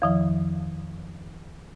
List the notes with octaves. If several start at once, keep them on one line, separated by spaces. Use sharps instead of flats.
F2 D#3 F3